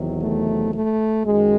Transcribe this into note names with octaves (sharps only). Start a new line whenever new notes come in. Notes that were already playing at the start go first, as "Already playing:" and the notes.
Already playing: E2 C3 D#3 F#3
A3
A3
F#2 D#3 F#3 G#3